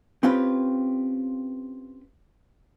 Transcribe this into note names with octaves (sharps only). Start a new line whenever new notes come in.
C4 C#4 F4 G4 B4